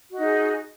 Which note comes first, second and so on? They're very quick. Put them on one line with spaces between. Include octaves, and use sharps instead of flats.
F#4 D#5 D#4 G#4